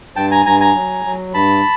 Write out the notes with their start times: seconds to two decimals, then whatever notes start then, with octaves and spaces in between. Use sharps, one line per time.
0.16 G2 G5 A5
0.31 G#5 A#5
0.45 G2 G#5 A#5
0.60 G#5 A#5
0.75 F#3
1.05 F#3
1.34 G2 A5 B5